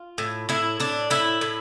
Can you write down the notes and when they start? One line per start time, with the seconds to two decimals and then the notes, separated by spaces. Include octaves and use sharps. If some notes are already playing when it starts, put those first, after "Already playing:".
Already playing: F4
0.18 A2
0.49 A2 E4
0.80 A2 D4
1.10 A2 E4
1.41 A2